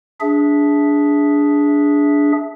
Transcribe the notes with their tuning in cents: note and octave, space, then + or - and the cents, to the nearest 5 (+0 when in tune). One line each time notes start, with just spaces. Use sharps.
D4 -15 G#4 +0 E5 +0